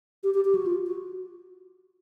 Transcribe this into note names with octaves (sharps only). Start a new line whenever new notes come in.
G4
G4
G4
F#4
F4
F#4